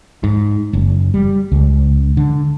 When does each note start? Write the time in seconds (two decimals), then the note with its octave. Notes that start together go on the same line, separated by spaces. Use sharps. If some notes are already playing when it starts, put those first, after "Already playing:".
0.24 G#2
0.73 F#1
1.14 G3
1.52 C#2
2.17 D3